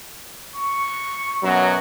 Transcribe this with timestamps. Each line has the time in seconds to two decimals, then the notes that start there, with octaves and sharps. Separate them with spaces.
0.55 C#6
1.43 F#2 B2 F#3